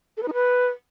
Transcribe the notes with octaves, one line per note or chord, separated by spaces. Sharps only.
A4
B4
D#4
B4